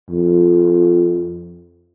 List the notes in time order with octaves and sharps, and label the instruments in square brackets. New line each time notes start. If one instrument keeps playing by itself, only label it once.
[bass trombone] F2